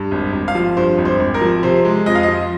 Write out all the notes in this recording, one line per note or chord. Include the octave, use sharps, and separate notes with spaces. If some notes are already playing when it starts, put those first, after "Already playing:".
Already playing: G2
G#1
G#1
F5
F3
G2 C5
G#1
C5
G#1
A#4
F3
C3 C5
G#3
F2 D#5
F5
D#5
F3